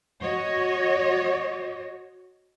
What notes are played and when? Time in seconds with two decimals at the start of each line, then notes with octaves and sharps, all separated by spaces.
0.22 F#4 C#5 D#5